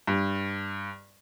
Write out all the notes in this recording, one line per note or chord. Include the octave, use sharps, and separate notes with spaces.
G2